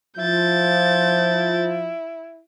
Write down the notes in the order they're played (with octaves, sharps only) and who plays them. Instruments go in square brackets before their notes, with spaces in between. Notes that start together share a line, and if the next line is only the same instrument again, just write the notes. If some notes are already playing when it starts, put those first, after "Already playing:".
[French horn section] F3 [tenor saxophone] E4 [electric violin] G6 A6